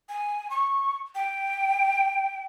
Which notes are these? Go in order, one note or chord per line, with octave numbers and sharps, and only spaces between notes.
G#5
C#6
G5